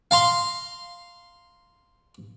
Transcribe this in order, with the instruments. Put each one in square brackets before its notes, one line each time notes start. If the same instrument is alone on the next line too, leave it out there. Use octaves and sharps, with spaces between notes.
[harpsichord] F5 A#5 C6